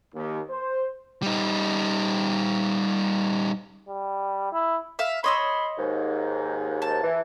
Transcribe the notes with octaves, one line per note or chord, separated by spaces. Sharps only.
D#2
C5
G3 D#4
G3
E4
E5 F5
C#5 D#5 B5 C6 E6
D#2 G#2
A5
E3